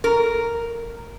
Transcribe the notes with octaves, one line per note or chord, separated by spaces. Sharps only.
A#4